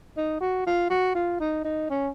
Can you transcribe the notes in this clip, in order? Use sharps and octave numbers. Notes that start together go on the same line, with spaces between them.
D#4
F#4
F4
F#4
F4
D#4
D#4
C#4